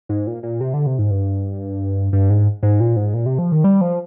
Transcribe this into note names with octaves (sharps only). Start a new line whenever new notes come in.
G#2
A#2
A#2
C3
D3
C3
G#2
G2
G2
G#2
G#2
A#2
G#2
A#2
C3
F3
D#3
G3
F3